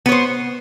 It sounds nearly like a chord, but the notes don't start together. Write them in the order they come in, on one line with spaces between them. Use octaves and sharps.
B3 C#5 C5